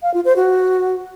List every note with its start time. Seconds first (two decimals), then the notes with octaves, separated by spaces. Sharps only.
0.03 F5
0.14 F4
0.25 C5
0.36 F#4